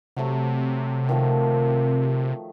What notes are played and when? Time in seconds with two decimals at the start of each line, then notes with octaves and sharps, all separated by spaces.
0.16 C3 F#3 A3
1.09 D#3 F3 A3